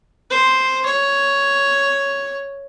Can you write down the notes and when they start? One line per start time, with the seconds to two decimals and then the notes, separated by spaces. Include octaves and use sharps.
0.30 C5
0.86 C#5